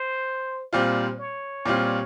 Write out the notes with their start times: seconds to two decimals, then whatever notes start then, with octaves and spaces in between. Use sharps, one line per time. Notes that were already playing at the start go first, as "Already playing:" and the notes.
Already playing: C5
0.73 A#2 G3 C4 F4 C5
1.19 C#5
1.65 A#2 G3 C4 F4